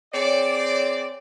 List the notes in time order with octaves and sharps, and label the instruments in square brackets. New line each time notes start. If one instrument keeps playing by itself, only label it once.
[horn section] C4 G#4 D5 [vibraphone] C#5